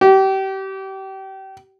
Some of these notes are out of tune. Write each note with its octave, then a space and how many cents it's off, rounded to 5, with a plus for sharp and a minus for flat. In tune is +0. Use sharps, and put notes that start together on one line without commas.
G4 -30